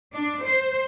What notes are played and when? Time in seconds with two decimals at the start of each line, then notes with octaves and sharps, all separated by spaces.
0.13 D4
0.43 C5